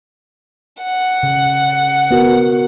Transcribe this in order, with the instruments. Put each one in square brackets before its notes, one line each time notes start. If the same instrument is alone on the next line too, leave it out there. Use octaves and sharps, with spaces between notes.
[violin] F#5
[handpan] C#3
B3 F#4 A#4